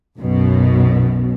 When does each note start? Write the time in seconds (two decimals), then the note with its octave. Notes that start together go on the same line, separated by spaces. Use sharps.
0.19 B1 F#2 B2